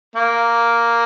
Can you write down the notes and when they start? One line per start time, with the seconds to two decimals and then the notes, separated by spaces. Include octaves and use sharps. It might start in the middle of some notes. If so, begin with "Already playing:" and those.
0.16 A#3